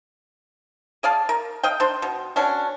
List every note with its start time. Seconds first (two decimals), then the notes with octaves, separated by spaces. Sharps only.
1.03 G#4 D5 F5 A5
1.29 A#4
1.63 D#5 F5 G5
1.80 D4 C5
2.02 B2
2.36 B2 C#4 D4